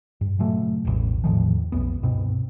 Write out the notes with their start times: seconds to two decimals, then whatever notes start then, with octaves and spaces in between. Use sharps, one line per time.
0.21 G2
0.39 A#2 C#3 F#3 A3
0.85 E1 A1
1.24 E2 A2 D#3 F3
1.72 B1 F2 B3
2.02 C#2 G2 B2 C4